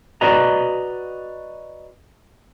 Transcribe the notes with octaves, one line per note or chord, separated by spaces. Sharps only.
F#4 B4 D5 D#5 A#5